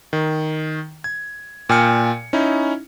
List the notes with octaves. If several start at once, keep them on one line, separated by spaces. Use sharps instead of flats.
D#3
G#6
A#2 G5 G#5 F6 C#7
C#4 D#4 E4